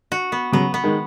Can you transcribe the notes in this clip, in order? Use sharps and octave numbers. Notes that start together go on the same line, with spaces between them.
F#4
B3
C#3 F#3 B3
B3
D#3 G#3